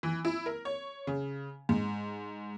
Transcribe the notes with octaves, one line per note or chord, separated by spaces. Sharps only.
E3
E4
A#4
C#5
C#3
G#2